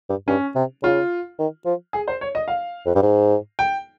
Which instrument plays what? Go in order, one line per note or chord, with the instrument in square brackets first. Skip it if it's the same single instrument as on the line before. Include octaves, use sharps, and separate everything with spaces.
[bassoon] G2
[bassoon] G2 [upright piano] C#4
[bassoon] C3
[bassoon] C#3 [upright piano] F4
[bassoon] D#3
F3
[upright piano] G#4
C5
C#5
D#5
F5
[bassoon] F2
G2
G#2
[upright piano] G5